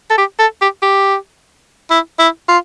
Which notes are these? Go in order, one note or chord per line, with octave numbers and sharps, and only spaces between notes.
A4
G4
A4
G4
G4
E4
E4
F4